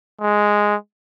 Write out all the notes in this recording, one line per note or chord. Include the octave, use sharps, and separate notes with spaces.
G#3